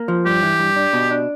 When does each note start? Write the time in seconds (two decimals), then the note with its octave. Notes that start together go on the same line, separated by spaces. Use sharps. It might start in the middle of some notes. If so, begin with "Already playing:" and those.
Already playing: A#3
0.08 F3
0.26 G2 G4
0.43 E3
0.59 G2
0.76 D4
0.93 B2
1.11 D4